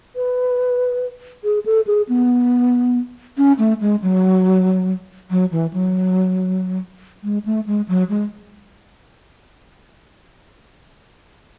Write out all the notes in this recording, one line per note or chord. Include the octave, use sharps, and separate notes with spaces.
B4
G#4
A4
G#4
B3
C#4
A3
G#3
F#3
F#3
E3
F#3
G#3
A3
G#3
F#3
G#3